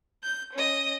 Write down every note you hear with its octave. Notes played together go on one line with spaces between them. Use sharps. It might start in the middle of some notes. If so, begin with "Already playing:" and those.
G6
C#4 D#5